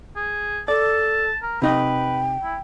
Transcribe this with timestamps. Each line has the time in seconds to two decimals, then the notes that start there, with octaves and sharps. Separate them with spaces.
0.16 G#4
0.68 A4 D5 A5
1.42 A#4
1.62 C3 D#4 B4 D#5 G5
2.43 E4